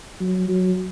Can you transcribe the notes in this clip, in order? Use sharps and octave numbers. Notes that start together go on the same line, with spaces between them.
F#3
F#3